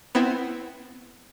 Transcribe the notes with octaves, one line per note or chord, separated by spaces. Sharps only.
B3 C4 E4